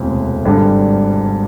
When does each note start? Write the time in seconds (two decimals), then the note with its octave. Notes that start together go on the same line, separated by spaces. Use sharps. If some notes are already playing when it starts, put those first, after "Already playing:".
Already playing: E1 D2 C3
0.45 G#1 G2 D3 G3